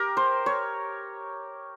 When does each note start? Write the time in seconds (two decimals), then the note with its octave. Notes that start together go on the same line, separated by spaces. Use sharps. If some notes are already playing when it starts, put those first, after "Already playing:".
Already playing: G4 A#4
0.17 C5
0.46 C#5